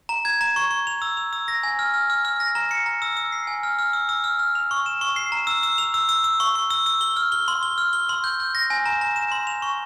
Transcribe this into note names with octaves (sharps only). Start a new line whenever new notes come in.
A#5
G#6
A#5
C#6
C#6
F7
E6
F7
E6
A#6
G#5
F6
F6
F6
F6
A#6
A#5
C#7
A#5
E6
E6
C7
G#5
F6
F6
E6
E6
F6
F6
F7
C#6
E7
C#6
C7
A#5
E6
E6
F7
E6
E6
E6
C#6
C#6
E6
E6
G7
F6
G7
C6
G7
F6
G7
C6
G6
G6
A#6
G#5
A#5
A#5
E7
C6
F7
C#6